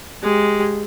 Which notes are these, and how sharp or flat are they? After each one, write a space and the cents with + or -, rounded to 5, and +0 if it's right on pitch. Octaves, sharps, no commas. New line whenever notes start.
G#3 +0 G4 -5